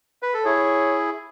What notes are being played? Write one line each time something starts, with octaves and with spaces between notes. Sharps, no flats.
B4
A4
E4 G#4 C#5